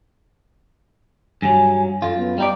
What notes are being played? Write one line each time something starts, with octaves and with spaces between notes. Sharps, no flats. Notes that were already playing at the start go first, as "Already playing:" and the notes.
G2 F#3 G#5
F#2 F4 A4
B3
G3 D#4 D5 G5